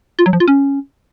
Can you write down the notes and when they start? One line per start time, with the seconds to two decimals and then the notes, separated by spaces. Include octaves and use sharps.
0.19 F4
0.26 F#3
0.33 F3
0.40 F4
0.48 C#4